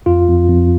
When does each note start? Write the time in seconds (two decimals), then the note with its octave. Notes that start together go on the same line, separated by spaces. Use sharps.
0.06 F2 F4
0.28 F2
0.49 F2